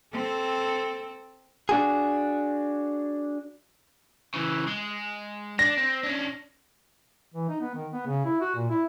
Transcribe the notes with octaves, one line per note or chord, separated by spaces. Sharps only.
C4 A4
D4 F#4 G#4
C#3 E3
G#3
D4 A#6
C4
C#4 D4
E3
D#4
B3
D#3
B3
C#3
E4
F#4
A#2
E4